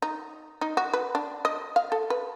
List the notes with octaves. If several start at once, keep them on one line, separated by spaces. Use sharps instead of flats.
D#4
D#4
F#4
B4
D4
D#5
F5
A4
B4